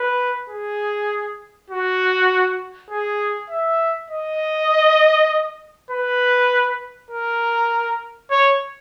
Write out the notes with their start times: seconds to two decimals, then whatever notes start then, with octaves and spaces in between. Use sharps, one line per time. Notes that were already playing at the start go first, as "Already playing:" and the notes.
Already playing: B4
0.49 G#4
1.70 F#4
2.90 G#4
3.50 E5
4.10 D#5
5.91 B4
7.10 A#4
8.31 C#5